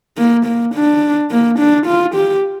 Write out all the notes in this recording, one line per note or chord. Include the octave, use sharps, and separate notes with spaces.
A#3
A#3
D4
A#3
D4
F4
G4